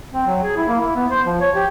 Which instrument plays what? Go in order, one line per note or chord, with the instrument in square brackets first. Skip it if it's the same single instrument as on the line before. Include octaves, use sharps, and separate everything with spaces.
[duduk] C4
F#3
G#4
E4
A#3
E4
B3
C5
F3
C#5
G4